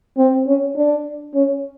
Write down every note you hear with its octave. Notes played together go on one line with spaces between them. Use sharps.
C4
C#4
D4
C#4